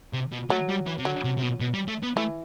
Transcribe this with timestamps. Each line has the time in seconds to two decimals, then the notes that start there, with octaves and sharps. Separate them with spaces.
0.13 C3
0.32 B2
0.50 F#3 A3
0.69 G3
0.86 E3
0.98 C3
1.05 D3 F#3
1.24 C3
1.38 C3
1.42 B2
1.60 B2
1.74 G3
1.88 A3
2.03 B3
2.17 E3 A3